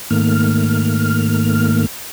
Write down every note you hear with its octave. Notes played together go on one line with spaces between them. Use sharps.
G#2 D#3 A3 A#3 F6